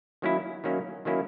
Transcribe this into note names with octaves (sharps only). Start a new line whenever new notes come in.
D#3 F#3 A#3 C#4 E4
D#3 F#3 A#3 C#4 E4
D#3 F#3 A#3 C#4 E4